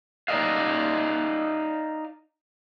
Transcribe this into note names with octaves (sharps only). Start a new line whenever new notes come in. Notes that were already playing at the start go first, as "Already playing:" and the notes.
D#4 D5 D#5 F5